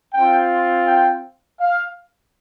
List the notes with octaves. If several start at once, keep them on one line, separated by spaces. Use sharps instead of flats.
C4 F4 G5
G5
F5